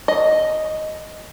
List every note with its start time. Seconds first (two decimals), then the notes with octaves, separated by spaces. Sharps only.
0.08 D#5